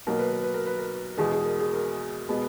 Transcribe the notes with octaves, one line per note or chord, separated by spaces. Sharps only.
B2 F#3 A#3 A#4
B4
A#4
B4
A#4
B4
A#4
E2 B2 G#3 G#4
G#4
A#4
G#4
A#4
B2 G#3 B3